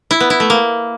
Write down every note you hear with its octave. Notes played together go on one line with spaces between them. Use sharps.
E4
B3
E4
A3
A#3